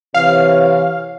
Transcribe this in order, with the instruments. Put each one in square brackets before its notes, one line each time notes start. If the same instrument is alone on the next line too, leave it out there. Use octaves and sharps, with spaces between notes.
[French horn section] C3 E3 C#5 [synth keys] F5